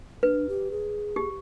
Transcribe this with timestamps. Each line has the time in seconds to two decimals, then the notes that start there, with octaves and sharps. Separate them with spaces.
0.23 D4 B4
0.49 G4
0.71 G#4
1.16 G4